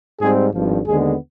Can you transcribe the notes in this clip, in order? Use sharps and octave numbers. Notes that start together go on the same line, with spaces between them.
G#2 G3 C4 G#4
G#1 G2 F3
D#2 D3 G#3 B3 G#4